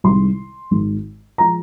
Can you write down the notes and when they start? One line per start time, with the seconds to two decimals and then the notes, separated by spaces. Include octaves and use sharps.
0.04 C2 C3 D#3 G#3 C6
0.71 G#1 G#2 D#3 G#3
1.38 F3 G#3 A#5